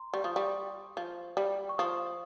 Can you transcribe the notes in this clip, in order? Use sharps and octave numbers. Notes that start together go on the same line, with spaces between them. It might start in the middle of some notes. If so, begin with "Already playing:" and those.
Already playing: A#5 C6
G3 C#6
F3 D#6
G3 C#6
F3
G3
C#6
F3 D#6